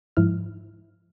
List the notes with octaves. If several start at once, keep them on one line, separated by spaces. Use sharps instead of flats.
G#2 F3 E4 F6